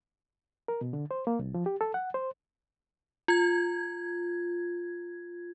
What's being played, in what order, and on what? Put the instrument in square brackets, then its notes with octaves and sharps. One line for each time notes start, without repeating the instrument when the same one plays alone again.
[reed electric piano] A#4
B2
D3
C5
A#3
C2
F3
G4
A4
F#5
C5
[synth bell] F4 G#6